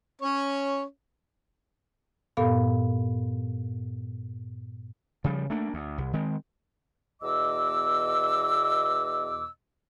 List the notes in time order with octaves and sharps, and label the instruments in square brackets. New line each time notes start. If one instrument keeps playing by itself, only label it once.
[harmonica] C#4 C#5
[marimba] G2 A#2 B3 A4 F5 B5
[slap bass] C#3 F3 G3
A3 A#3 D4
D2
C2
D#3 G#3 C4
[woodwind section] E2 B2 D#5 D6 E6